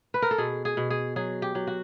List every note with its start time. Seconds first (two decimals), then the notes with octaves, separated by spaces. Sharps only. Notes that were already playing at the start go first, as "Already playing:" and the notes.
0.14 B4
0.22 A#4
0.31 A4
0.38 B2 G#4
0.65 G#4
0.77 B2
0.90 G#4
1.16 F#3 G#4
1.42 G4
1.55 F#3
1.67 F#4